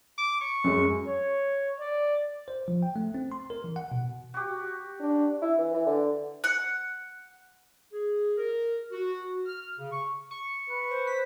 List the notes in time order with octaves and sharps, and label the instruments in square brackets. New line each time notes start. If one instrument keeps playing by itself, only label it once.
[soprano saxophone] D6
C#6
[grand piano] F#2 G#3
[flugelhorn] C#5
D5
[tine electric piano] C5
F3
G5
A3
C4
C6
A#4
E3
F#5
B2
[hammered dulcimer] F#4 G4
[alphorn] D4
[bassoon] E4
E3
E3
D3
[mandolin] F#5
[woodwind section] G#4
A#4
F#4
F6
C#3
C#6
[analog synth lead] C#6
[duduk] B4
[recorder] C5
[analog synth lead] B6